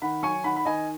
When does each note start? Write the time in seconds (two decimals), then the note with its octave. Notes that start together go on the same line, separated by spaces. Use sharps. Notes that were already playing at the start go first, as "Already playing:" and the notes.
0.02 D#3 F#5 B5
0.23 F#3 G#5 C#6
0.44 D#3 F#5 B5
0.56 B5
0.65 D#3 D#5 G#5